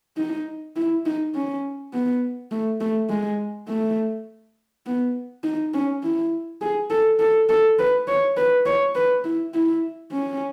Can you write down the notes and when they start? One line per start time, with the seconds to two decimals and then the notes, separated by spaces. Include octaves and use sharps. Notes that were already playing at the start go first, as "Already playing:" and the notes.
0.17 D#4
0.76 E4
1.06 D#4
1.35 C#4
1.94 B3
2.51 A3
2.81 A3
3.09 G#3
3.68 A3
4.86 B3
5.44 D#4
5.74 C#4
6.03 E4
6.61 G#4
6.90 A4
7.19 A4
7.49 A4
7.79 B4
8.08 C#5
8.37 B4
8.66 C#5
8.95 B4
9.24 E4
9.54 E4
10.12 C#4